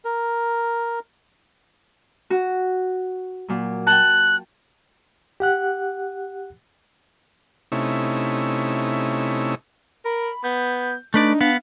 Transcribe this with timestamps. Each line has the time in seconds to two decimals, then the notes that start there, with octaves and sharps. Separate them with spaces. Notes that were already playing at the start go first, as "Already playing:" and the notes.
0.05 A#4
2.30 F#4
3.48 A#2 F#3
3.87 G5 A5 F#6
5.40 G4 F#5 F#6
7.72 C3 A3 C#4 D#4 E4
10.05 A#4 B5
10.44 B3 G6
11.14 A3 D4 D#4 B4 D5
11.41 B3 F5